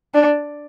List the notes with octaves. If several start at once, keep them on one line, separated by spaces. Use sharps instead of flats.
D4